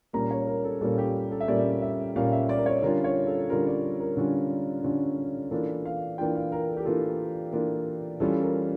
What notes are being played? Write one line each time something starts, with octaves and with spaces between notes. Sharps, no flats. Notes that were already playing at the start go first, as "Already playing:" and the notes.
A#2 G3 A#3 C#4 A#5
C#5
A#4
A4
A#2 G3 A#3 C#4 A4
G4
A4
E5
A#2 G3 A#3 C#4 D5
E5
A#2 G3 A#3 C#4 F5
E5
D5
A#4
C#5
D3 G3 C#4 F4 A#4
C#5
A4
D3 G3 C#4 F4 A#4
D5
A#4
D3 G3 C#4 F4
D3 G3 C#4 F4
E3 A#3 D4 F4 A4
F5
E3 A#3 D4 F4 G5
F5
A#4
A4
G4
E3 A#3 D4 F4 A4
E3 A#3 D4 F4
E3 G3 C#4 F4 A4
A#4